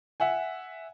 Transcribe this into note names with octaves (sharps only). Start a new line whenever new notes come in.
E5 F#5 G#5